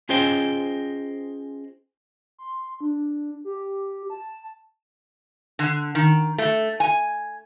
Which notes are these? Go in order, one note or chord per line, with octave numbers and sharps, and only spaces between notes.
C#4 F4 G#4 C5 D#5 G5
C6
D4
G4
A5
D3
D#3
A3
G#5